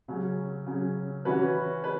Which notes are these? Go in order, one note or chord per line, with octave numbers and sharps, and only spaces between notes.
C#3 F#3 C#4
C#3 F#3 C#4
E3 C#4 F#4 B4
B4